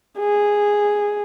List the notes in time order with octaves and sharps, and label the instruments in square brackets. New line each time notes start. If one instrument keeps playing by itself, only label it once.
[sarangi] G#4